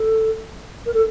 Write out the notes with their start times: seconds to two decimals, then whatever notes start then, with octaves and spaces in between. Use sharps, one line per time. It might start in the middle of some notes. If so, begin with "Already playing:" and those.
Already playing: A4
0.86 A#4
0.94 A4